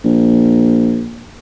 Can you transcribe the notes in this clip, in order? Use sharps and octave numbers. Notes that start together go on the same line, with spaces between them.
A#1